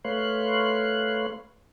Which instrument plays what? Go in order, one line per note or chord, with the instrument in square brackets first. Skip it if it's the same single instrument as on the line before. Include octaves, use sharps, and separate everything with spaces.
[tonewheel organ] A3 B4 C#5 F5 C6 F#6